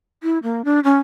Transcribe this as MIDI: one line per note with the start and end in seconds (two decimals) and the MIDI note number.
0.23 0.38 64
0.43 0.62 58
0.65 0.80 62
0.84 0.99 61